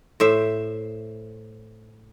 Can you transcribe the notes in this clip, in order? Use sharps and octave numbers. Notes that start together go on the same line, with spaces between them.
A2 C5 E5